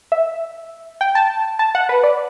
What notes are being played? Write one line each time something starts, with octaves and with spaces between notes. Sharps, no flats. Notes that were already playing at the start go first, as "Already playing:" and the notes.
E5
G5
A5
A5
F#5
B4
D5